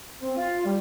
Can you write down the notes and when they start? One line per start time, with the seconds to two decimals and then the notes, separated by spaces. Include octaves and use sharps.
0.22 C4
0.37 F4
0.66 G3